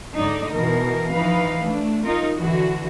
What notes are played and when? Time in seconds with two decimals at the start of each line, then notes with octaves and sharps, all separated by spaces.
0.17 G#2 D3 D#4 D5
0.52 B2 E3 A#4
1.13 E3 F3 D#4 B4 F5
1.64 A3 D4
2.02 D#4 F4 A#4
2.36 D3 E3 F#4